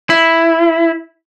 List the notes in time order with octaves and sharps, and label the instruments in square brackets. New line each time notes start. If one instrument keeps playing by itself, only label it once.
[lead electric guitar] E4